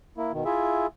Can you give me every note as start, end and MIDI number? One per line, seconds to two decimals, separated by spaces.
0.18 0.32 58
0.18 0.32 64
0.33 0.44 47
0.33 0.44 51
0.45 0.87 64
0.45 0.87 65
0.45 0.87 68
0.45 0.87 76